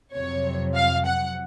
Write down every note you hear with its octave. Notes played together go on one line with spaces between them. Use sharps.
F2 C3 F#3 C#5
F5
F#5